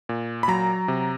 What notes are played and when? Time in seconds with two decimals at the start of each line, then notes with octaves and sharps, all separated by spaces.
0.09 A#2
0.43 B5
0.48 F#3 A#5
0.88 C3